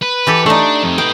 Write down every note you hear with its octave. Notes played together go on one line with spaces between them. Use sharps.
B4
E3 G4 A4
A3 D4 D#4 D5
F2
B4 D#5 G5